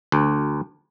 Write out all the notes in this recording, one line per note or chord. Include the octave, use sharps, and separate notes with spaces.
D2